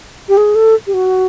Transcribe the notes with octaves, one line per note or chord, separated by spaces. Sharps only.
G4
G#4
A4
G4
F#4